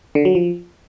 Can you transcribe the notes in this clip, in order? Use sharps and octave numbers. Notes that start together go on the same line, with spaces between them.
D3
F#3
F3